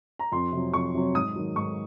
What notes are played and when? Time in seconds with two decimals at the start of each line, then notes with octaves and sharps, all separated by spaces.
0.19 A#5
0.32 F2 C6
0.52 C3 F#3
0.73 F2 C#6
0.94 C3 F#3
1.15 G#2 D#6
1.36 D#3 F#3
1.55 G#2 C#6